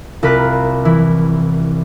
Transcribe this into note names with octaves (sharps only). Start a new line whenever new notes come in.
C2 F4 A#4 B5 F#6
E3 E4